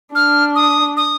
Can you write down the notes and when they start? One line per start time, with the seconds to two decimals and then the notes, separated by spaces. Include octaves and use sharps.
0.15 D4 F6
0.55 D#6
0.97 D#6